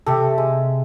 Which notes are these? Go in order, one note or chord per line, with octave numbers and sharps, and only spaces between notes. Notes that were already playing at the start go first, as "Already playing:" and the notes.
C3 A3 G4 A4
G#3